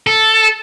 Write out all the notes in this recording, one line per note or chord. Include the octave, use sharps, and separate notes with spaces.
A4